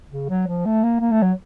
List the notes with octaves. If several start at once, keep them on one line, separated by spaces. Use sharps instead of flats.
C#3
F#3
F3
A3
A#3
A#3
A3
F#3